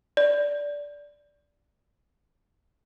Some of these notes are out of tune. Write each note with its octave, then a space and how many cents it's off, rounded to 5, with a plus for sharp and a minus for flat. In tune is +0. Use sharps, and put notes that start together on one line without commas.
D5 -10